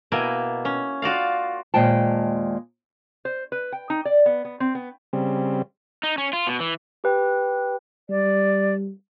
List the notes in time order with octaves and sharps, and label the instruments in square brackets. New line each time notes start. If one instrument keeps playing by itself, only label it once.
[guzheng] B2 A#3 E4 G5 G#5
C#4
F4 F#4 D5 F5
[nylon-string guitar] D#2 A#2 G#3 C5 G5 A5
[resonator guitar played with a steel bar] C5
B4
G5
D#4
D5
B3
B3
C4
B3
[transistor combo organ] C#3 G3 C4
[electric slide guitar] D#4
C#4
F4
B2
E3
[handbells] G4 B4 G5
[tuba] G3 [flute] D5